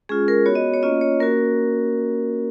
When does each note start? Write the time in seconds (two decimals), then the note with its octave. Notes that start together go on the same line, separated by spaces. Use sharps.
0.09 G#3 C#4 F4 G#4
0.28 A#4
0.46 B3 F#4 C#5
0.55 D#5
0.74 C#5
0.83 A#3 C#4 F4 D#5
1.01 C#5
1.20 A#3 C#4 F#4 A#4